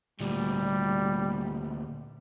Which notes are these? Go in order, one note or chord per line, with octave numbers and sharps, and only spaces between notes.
D2 A#2 G3